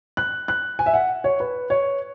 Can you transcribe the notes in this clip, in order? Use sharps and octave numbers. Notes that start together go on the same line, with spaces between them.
F#6
F#6
G#5
E5
F#5
C#5
B4
C#5